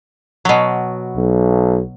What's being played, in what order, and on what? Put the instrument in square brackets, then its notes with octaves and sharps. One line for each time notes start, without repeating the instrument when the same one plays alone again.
[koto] B2 F#3
[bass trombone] B1